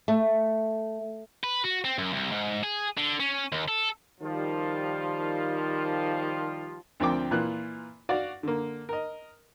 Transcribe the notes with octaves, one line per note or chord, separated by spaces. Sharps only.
A3
B4
F#4
C4
F#2
C2
G#2
G#4
D3
C#4
D#2
A4
D#3 F3 G3 F4
D2 F3 C4 A#4 G5 D6
A#2 E3 F4 F#6
F#4 D5 F5
D3 A#3
A#4 D#5